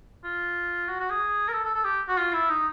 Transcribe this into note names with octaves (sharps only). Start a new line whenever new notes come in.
F4
F#4
F#4
G#4
A#4
A4
A4
A4
G4
F#4
F4
E4
D#4